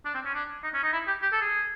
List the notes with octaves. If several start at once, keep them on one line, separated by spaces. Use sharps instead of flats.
D4
C4
C#4
D4
D#4
C#4
D#4
E4
G4
G4
A4
G#4